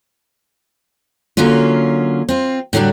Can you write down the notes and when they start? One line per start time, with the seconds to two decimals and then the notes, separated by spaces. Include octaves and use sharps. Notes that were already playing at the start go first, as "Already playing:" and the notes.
1.37 D3 F#3 A#3 C#4 F4
2.29 C4 F4
2.73 A2 D3 F#3 G3 D4